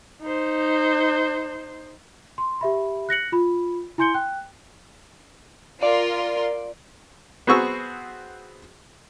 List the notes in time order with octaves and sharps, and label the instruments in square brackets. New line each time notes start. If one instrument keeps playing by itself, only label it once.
[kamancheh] D#4 C5
[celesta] C6
G4 E5 B5
F#6 A#6 C#7 F#7
F4 B5
E4 G#5 C6 G6 C#7 G7
G5 F#6
[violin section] F4 A#4 C6 [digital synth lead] D5
[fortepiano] B3 C4 F#4 G#4 C#6 E6